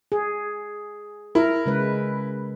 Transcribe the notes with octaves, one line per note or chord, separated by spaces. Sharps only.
G#4
E4 A#4
C#3 G#3 B4